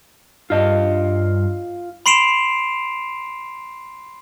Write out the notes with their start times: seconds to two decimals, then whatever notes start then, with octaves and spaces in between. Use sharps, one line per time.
0.50 G2 F4 D#5
2.06 B5 C6 C7 D7 E7 F7